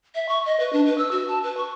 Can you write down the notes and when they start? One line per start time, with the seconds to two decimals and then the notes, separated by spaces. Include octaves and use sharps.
0.15 E5
0.29 C#6
0.46 D#5
0.60 B4
0.73 D4
0.86 B4
0.98 E6
1.12 F#4
1.28 A5
1.43 B4
1.57 C#6